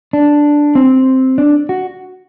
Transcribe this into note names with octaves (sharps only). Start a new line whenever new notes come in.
D4
C4
D4
F#4